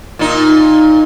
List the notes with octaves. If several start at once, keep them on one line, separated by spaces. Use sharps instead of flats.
A#2 D#4